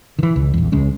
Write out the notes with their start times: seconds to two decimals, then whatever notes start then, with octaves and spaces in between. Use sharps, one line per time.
0.19 D#3 E3
0.36 C#2
0.54 A#1 E2
0.72 C#2 G#3 C#4